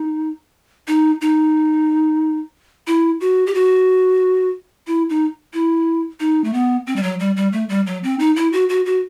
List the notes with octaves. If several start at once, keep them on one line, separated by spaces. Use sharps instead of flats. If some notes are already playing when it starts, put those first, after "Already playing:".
Already playing: D#4
D#4
D#4
E4
F#4
G4
F#4
E4
D#4
E4
D#4
A3
B3
C4
G3
F#3
G3
G3
A3
G3
F#3
C4
D#4
E4
F#4
F#4
F#4